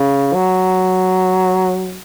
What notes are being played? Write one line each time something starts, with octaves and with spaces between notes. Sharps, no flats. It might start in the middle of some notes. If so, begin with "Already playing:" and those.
Already playing: C#3
F#3